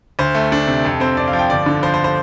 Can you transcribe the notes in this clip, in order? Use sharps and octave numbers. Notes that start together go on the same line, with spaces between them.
D2 C5
A3
D4
C3
F2 A4
C4 C5
F2 D5
F5
F3
G5
G1 D5
D3
F3 C5
C5
C5